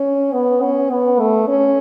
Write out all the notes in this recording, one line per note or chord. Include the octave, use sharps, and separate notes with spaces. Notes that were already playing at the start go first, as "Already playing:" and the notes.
Already playing: C#4
B3
C#4
B3
A3
C#4